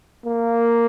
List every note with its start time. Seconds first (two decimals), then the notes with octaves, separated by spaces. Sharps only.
0.25 A#3